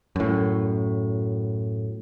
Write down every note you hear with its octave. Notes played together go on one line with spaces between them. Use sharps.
F#2 A2